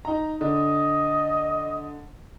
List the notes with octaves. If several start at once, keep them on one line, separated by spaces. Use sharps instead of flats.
D#4 A#5
D3 D#5